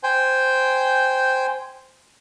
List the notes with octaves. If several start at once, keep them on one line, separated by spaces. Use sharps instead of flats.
C5 G5 G#5